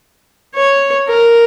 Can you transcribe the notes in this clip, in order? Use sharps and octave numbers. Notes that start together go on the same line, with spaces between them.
C#5
A#4